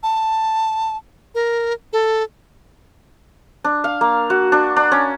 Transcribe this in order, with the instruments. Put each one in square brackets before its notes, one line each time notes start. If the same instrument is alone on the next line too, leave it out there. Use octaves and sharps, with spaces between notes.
[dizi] A5
A#4
A4
[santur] D4
F5
A#3
F#4
D4
D4
C#4